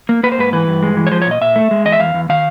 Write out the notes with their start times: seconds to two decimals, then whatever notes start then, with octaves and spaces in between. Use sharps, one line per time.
0.09 A#3
0.23 A#3 B4
0.32 C5
0.38 G#2 B4
0.53 E3 B4
0.68 G2
0.83 G#3
0.97 E3
1.07 C#5
1.12 F3 C5
1.22 C#5
1.26 A#2
1.31 D#5
1.41 A#2 E5
1.56 A3
1.71 G#3
1.85 E2 D#5
1.92 E5
2.00 E2 F5
2.14 E2
2.29 D#3 F5